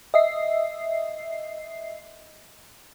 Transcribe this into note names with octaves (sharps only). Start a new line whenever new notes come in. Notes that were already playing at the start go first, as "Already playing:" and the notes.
D#5 E5 C7